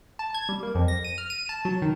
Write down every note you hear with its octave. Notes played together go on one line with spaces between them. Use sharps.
A5
G#6
G3
A#3
F2
A#6
D#7
F6
D#7
A5
F#3
D#3